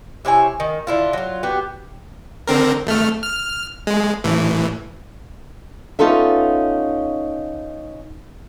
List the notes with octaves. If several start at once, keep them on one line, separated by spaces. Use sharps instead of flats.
C3 E4 C#5 G#5
D#3
D3 E4 F4
F#3 F4
B3 F#4 G4
D3 C4 A#4
G#1 A3 F6
F6
G#3
A1 A2 E3
B3 C#4 D#4 F4 A4 E5